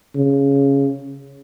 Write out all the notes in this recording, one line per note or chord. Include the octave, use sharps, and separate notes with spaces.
C#3